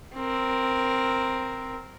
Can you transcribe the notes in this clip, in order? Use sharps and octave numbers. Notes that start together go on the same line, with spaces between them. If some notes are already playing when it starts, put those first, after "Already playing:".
C4 A#4